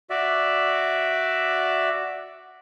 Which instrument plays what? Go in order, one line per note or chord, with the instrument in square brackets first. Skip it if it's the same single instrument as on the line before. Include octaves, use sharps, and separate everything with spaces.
[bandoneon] F#4 D5 E5